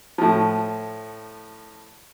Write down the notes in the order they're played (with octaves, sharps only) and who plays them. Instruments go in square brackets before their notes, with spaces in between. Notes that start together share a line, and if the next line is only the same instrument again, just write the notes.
[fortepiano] A2 F3